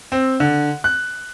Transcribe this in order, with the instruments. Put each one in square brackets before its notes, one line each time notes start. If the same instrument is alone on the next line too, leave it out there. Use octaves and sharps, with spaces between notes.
[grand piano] C4
D3
F#6